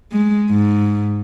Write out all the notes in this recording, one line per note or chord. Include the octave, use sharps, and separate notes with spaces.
G#3
G#2